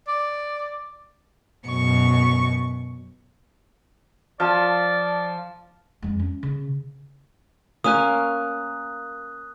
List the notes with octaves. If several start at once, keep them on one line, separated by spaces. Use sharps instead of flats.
D5
F#2 B2 C#6
F3 D5 A5 F6 A6
F2 G#3
C#4
C#3
A#3 C#4 G#5 D#6 F#6